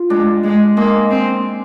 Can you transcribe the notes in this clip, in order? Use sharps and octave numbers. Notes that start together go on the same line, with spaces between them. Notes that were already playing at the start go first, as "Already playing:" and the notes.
Already playing: F4
G#3 D4
G#3
G#3 A#3
C4